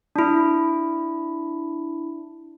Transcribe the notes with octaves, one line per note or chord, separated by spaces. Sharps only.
D4 E4